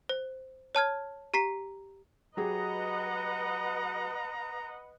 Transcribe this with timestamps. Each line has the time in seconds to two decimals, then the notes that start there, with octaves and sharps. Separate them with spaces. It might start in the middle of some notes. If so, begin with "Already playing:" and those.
0.09 C5
0.75 C#5 A5 F6 G#6
1.34 G4 A#5 B6 C7
2.37 F#3 G4 G#4 B4 D#5 F#5 A#5